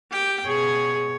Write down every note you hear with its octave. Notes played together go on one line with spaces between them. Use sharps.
G4 G5
B2 G#4 C#5